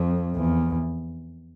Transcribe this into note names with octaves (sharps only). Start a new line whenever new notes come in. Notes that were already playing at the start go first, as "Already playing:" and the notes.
Already playing: F2
E2